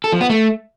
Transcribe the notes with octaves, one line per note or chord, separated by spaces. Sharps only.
A4
F3
B3
A3